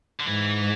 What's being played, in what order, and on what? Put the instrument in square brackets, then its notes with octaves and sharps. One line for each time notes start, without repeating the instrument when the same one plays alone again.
[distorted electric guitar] D3
[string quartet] G#2 [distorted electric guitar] E3